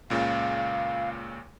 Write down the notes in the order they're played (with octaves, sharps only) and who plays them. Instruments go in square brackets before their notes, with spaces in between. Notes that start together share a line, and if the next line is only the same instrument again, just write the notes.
[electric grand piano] C#2 A#2 C#3 [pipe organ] F5